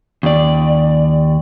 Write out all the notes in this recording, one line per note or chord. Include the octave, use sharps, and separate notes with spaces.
D#2 D5